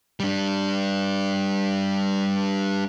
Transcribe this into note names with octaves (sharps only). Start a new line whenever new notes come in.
G3 D4